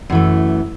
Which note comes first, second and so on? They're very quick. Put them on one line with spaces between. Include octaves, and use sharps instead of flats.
F#2 E3 A3